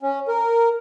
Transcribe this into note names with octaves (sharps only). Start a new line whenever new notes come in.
C#4
A#4